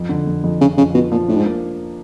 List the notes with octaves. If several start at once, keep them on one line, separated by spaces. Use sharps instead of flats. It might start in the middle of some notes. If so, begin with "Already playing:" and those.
Already playing: F2
D3
F2
F2
F2 C#3
F2 C#3
B2 F3
A#2 F3
A2 D4
G#2
A#3